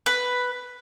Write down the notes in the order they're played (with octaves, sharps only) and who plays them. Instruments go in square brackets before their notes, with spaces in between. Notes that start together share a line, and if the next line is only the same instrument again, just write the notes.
[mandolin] B4